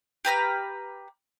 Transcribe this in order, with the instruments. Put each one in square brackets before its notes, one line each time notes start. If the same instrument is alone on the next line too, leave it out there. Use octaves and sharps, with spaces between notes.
[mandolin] G4 B4 A#5 F6